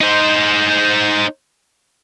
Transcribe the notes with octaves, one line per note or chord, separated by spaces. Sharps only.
D#4 C5